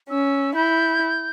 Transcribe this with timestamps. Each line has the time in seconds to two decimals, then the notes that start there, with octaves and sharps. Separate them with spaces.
0.10 C#4 E6
0.55 E4 G6